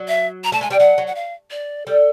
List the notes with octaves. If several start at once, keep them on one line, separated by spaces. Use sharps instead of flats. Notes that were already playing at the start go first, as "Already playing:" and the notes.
Already playing: F#3
E5
A#5
A3 A5
G#3 G#5
G3 G5
F#3 F#5
F#3
F#5
F5
D5
G3 A4